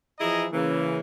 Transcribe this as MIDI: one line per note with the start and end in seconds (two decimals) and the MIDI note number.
0.19 0.46 52
0.19 0.46 53
0.19 0.46 64
0.19 0.46 68
0.19 0.46 75
0.19 0.46 82
0.51 0.99 49
0.51 0.99 52
0.51 0.99 58